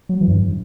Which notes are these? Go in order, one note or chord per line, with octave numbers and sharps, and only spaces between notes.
F#3
E3
F#2
G2